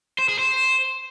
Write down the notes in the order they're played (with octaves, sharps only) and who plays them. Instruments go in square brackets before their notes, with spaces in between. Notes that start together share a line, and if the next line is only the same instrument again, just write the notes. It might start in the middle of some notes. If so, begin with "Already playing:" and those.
[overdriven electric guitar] C5
G#4
C5